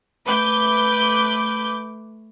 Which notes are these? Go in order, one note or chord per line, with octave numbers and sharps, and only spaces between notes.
A3 B4 D6 G6